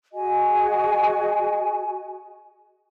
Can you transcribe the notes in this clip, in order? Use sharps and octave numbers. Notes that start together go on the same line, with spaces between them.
F#4 G#4 D#5 G#5